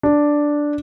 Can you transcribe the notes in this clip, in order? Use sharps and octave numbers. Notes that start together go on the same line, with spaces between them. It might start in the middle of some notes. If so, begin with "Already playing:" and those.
D4